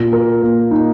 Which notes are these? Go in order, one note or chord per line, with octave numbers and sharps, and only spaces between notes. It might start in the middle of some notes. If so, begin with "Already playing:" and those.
Already playing: A#2
A#4
A#3
D#4